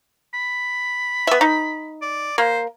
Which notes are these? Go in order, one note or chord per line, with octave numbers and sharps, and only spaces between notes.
B5
B3 E5
D#4
D5
A#3 C5